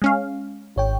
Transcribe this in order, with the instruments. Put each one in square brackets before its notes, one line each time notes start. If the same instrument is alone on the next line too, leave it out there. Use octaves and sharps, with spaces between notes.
[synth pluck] G#3 C#4 F5
[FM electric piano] G#1 C#5 G5